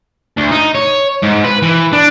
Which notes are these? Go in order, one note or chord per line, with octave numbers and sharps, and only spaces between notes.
D2
D#4
C#5
G#2
B4
E3
D4